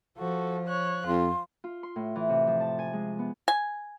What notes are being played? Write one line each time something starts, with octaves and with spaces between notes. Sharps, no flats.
F3 F#4 A4
C#5 F#6
F2 F4 C6
F4
C6
A2
E3
C3
F3
A5
G#5
G#3
B3
G#5